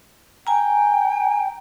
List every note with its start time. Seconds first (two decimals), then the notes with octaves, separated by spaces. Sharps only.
0.47 G5 G#5 A#5